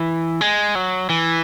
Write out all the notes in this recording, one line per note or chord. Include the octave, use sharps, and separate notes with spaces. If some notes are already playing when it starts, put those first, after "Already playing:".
Already playing: E3
G#3
F#3
E3